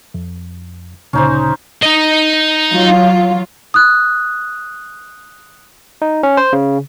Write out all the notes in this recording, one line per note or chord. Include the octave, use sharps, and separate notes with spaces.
F2
D2 A#2 C#3 C#4 D#4 C5
D#4 D#5
F#3 F4
D#6 F#6
D#4
C#4
C5
C#3